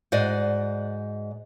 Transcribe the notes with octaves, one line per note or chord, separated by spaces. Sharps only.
G#2 F#4 D5 D#5